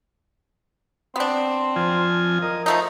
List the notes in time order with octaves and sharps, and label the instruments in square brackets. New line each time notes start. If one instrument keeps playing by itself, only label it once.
[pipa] B3 D4 [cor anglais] C4
[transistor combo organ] F2 F3 G#5
[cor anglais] A#4 [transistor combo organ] D#5
[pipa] F3 A3 D#4 [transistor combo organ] A#5